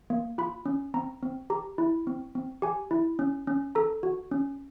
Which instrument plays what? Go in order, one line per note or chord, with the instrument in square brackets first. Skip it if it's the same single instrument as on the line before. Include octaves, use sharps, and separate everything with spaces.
[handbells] A#3
F4 B5
C#4
C4 A#5
C4
G4 A#5
E4
C4
C4
G4 G#5
E4
C#4
C#4
A4 A#5
F#4
C#4